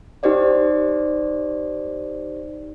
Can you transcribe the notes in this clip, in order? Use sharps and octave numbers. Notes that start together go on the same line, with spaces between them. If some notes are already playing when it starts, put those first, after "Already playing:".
D#4 G4 C5 D5 D#5